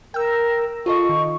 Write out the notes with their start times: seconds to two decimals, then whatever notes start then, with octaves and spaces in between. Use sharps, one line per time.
0.14 A#4 G5 E6
0.86 F4 A4 D#5 C#6
1.09 D#3